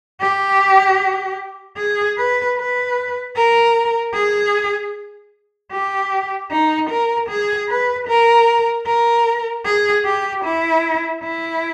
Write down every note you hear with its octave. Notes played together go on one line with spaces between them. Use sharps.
G4
G#4
B4
B4
A#4
G#4
G4
D#4
A#4
G#4
B4
A#4
A#4
G#4
G4
E4
E4